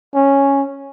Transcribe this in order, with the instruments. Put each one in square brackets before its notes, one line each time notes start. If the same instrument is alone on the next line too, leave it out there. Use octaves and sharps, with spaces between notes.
[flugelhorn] C#4